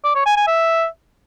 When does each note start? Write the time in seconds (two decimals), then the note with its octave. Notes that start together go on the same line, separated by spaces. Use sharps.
0.04 D5
0.15 C#5
0.26 G#5
0.36 G#5
0.47 E5